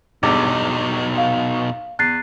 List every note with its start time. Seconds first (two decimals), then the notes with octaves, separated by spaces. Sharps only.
0.23 G#1 E2 G2 B2 D#4 D6
1.18 F5
1.99 E2 F#6 A6 C7